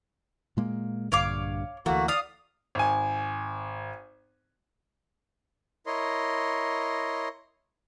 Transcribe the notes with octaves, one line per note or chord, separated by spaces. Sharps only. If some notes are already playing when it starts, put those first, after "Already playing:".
A#2 G#3 A#3
A#1 G2 D3 C#5 F5 D6
D2 E3 A3 A#3 F#4
D5 F5 D#6
G#1 G#5
E4 A#4 C#5 D#5 C6